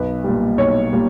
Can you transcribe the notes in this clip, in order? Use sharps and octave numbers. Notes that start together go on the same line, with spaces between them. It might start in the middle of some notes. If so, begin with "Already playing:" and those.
Already playing: B1 B4
A#2 G3
B1 C#5
A#2 G3